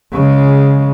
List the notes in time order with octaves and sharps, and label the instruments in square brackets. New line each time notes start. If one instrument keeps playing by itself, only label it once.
[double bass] C#3 G#3